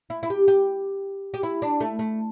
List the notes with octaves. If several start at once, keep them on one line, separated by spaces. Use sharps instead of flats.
E4
E4
G4
G4
G4
E4
D4
A3
A3